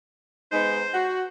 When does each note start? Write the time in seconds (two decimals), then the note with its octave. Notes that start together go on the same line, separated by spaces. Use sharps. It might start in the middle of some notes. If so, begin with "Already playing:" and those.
0.52 G#3 B3 D#4 C5
0.93 F#4